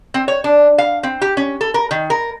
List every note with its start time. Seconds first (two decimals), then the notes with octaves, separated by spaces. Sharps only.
0.14 C4
0.28 C#5
0.44 D4
0.78 F5
1.03 C4
1.22 G4
1.37 C#4
1.61 A4
1.74 A#4
1.91 D#3
2.10 A#4